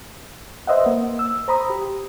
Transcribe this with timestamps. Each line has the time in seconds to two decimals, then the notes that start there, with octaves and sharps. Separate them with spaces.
0.67 B4 C5 D#5 E5 F#5
0.86 A#3
1.19 E6
1.48 C5 A#5 B5 D#6
1.70 G4